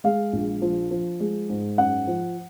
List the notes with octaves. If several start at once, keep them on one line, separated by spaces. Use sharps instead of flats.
G#3 F5
A#1
F3
F3
G#3
G#2
F#2 F#5
F3